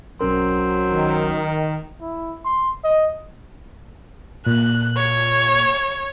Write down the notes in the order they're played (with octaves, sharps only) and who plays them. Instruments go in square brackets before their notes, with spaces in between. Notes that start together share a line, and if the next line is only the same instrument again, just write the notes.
[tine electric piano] B1 C#4 A#4 [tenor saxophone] F#3 [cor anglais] C4
[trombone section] D#3
[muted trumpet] E4
C6
D#5
[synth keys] A#2 [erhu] F#6
[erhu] C#5